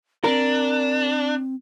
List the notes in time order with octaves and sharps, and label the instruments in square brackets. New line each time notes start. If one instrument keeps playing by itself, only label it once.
[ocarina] C4 [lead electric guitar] D4 [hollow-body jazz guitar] A#4